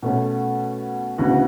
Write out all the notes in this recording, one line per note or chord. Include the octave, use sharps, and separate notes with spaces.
B2 A3 C#4
D2 C#3 E3 B3 F#4